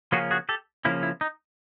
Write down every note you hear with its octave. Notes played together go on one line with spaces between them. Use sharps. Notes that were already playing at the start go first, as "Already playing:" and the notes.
C#3 F3 A#3 C#4 F#4 G#4
F#4 G#4
G4 A4
C#3 F3 A#3 C#4 E4
E4
D#4